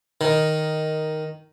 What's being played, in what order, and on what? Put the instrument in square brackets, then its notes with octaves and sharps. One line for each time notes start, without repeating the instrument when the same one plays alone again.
[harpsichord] D#3